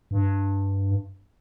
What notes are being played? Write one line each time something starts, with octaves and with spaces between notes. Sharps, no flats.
G2